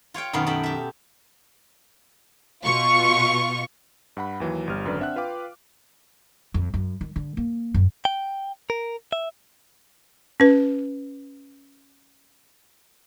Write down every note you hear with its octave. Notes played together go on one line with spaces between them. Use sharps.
F4 C#5 F5 G5
F#2 B2 D#3 B3 F5
F#2 A4 G5 A5 B5
G4 E5
B2 F4 C#6
G2 F#5 B5
D#2 E3 F#3
G1 G3 F6
G#1 F#2 D3 B4 D5
C4 D4 E5 F#5 F#6
F4 B4 F5 G5 D6
F2
F#2
D#3
D3
A#3
F#2
G5
A#4
E5
C#4 B4